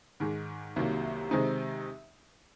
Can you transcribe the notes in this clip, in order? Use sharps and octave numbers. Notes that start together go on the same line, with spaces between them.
G#2 D#3 G#3
C2 C3 D#3 F#3 A#3
C3 D#3 G#3 C4 D#4